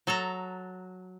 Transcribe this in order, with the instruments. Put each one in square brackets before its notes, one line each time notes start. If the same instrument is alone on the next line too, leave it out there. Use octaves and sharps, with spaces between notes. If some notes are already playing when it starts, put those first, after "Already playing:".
[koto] F#3 A4 A5 A#5